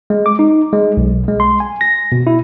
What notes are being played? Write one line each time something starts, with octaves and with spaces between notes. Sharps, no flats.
G#3
D6
D#4
G#3
B1
G#3
C6
G#5
A#6
B2
E4